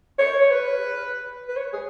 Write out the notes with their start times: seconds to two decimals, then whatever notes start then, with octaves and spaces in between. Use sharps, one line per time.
0.19 C#5
0.42 C#5
0.51 B4
1.48 B4
1.56 C#5
1.73 G#4